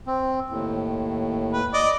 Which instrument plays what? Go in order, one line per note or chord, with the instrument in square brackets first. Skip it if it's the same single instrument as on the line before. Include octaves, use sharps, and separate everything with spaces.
[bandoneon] C4
D#2 A2
[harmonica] B4
D5 D#5